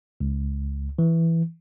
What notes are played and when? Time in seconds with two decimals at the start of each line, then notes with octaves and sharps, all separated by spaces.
0.21 C#2
0.99 E3